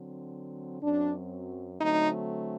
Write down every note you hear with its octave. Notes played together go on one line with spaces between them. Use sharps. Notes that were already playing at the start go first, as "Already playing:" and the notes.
Already playing: D3 F#3 C4
F#2 F#3 C4 D4
D3 F#3 A3 C4 D#4